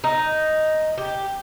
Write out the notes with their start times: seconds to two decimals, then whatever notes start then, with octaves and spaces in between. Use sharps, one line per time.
0.04 D#4
0.98 G4